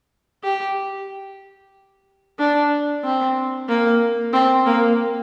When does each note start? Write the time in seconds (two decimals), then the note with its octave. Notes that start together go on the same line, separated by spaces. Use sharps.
0.43 G4
2.39 D4
3.04 C4
3.68 A#3
4.33 C4
4.66 A#3